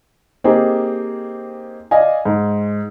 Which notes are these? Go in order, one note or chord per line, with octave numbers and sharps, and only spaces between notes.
A#3 C4 D#4 G4 G#4
D5 D#5 F5 G#5
G#2